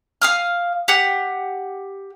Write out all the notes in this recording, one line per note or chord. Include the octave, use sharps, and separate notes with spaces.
F5 D#6 F6
G4 F#5